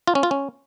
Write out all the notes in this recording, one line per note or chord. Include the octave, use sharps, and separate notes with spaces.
F4
C#4
F4
C#4